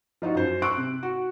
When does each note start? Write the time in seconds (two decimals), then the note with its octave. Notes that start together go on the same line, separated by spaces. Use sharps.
0.22 F3 D#4 F4 F#4
0.35 F#2 C5
0.62 C6 C#6 E6 F#6 D7
0.77 C3
1.03 F#4